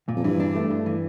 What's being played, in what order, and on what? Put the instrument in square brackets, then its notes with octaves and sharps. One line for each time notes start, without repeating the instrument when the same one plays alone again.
[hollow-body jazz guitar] A#2
[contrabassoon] F2
[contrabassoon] G2 [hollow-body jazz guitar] E3
[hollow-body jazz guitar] D4
A3
G2
E3